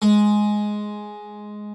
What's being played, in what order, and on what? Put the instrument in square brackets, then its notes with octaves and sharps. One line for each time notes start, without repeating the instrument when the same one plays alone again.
[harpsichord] G#3